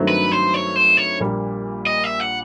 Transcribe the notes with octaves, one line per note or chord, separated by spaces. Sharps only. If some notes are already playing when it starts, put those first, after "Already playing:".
Already playing: G2 D#3 F#3 A3 C4
B4
C5
C#5
C5
C#5
A#1 A#2 G3 A#3
D#5
E5
F#5